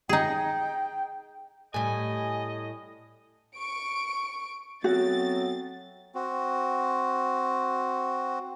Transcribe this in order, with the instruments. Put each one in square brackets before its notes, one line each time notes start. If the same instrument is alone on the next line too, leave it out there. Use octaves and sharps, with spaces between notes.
[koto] D#4 G#4 [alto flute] G5
[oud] A2 G3 [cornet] D#5 [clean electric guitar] G#5
[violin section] C#6 D7
[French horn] F#3 [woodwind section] A3 B3 C4 [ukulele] F#4 [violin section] A6
[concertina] C4 F#4